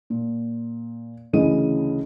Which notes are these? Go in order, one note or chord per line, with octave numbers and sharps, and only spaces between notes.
A#2
D2 C#3 E3 C#4 D#5 D#7